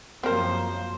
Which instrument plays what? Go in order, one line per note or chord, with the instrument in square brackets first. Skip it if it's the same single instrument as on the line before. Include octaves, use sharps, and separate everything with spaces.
[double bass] F#2 F3 [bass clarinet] A#3 [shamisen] C4 A#4 [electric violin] C5